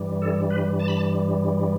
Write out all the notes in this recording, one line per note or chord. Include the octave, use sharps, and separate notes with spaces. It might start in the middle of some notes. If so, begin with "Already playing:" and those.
Already playing: G2 E3 G3
A4
B4
A5
B5
A5